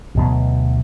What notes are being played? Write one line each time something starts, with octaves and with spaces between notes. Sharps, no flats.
D2 B2 F#3